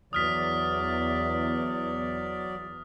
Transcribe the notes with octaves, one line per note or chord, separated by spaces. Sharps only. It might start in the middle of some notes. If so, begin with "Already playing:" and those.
E2 F#3 D5 D#6 F6 B6